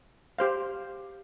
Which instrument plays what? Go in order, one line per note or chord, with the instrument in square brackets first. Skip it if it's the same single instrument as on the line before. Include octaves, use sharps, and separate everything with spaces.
[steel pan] G4 C5 F5